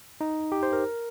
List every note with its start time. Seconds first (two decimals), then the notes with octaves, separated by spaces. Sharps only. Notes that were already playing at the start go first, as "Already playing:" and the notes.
0.21 D#4
0.52 G4
0.63 C5
0.73 A#4